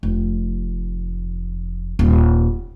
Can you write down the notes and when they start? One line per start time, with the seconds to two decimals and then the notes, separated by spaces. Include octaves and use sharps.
0.03 F1
1.99 D#1